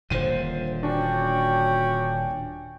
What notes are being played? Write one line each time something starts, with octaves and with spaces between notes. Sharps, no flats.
D#1 A#2 D3 C5 D#7
C#4 D4 F#4 G5